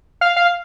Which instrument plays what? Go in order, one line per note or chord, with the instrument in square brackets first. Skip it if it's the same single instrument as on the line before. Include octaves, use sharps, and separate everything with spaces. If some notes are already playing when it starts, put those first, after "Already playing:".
[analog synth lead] F5
F5